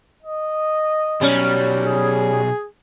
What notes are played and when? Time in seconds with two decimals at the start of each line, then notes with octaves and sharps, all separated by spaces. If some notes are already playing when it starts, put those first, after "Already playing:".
0.22 D#5
1.21 B2 F#3 G3 C#4
1.84 G#4